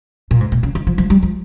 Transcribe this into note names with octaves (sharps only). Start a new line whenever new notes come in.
A#2
G#2
A#2
C#3
D#3
F3
F3
G3
F3